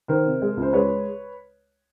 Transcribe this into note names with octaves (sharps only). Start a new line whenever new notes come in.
D#3 A#4 C5
C3
G#3
C#2 C5
G#3 B4 C#5